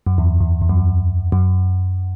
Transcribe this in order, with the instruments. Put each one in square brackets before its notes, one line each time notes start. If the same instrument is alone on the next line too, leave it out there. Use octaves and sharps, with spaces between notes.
[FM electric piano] F#2
E2
E2
E2
F#2
F#2